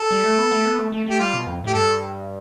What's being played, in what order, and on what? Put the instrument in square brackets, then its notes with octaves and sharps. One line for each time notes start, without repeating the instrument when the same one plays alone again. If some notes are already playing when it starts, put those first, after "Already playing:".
Already playing: [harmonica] A4
[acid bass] G3
A3
B3
A3
B3
A3
A3
[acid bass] A3 [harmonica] G4
[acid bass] G3 [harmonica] F4
[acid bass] B2
F2
[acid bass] A2 [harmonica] G4
[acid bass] G2 [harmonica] A4